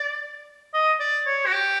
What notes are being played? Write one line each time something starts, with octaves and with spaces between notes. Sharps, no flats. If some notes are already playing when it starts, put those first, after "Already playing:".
Already playing: D5
D#5
D5
C#5
F#4
G4